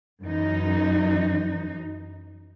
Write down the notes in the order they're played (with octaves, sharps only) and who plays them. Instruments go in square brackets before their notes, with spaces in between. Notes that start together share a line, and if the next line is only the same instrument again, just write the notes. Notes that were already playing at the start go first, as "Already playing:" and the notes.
[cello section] F#2 E3 D#4